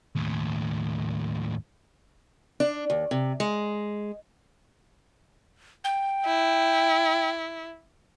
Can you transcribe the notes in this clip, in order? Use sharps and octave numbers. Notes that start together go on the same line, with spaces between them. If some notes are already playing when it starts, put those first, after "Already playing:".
D#2 A2
D4
D#2
C3
G#3
G5
E4